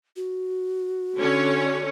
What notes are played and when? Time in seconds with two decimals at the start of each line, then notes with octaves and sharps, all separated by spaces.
0.16 F#4
1.18 D3 C#4 C#5